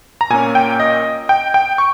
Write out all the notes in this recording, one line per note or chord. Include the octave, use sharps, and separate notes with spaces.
A#5
A#2 A#3 C#4 G#5
G5
D#5
G5
G5
C#6